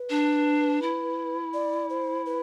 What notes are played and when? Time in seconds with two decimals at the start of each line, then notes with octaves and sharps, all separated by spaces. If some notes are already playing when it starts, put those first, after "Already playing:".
Already playing: B4
0.10 D4
0.82 E4
1.54 D5
1.90 C5
2.26 B4